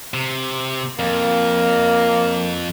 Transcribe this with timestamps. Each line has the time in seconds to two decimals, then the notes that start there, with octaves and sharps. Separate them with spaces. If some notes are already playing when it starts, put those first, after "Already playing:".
0.14 C3
0.99 F2 A#3